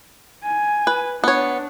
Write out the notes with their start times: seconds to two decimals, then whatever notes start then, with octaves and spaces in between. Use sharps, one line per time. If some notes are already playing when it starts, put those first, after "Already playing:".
0.44 G#5
0.87 B4
1.24 B3 D4 C#5